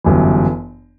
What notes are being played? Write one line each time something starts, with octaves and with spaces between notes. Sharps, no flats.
G1 F#2 E3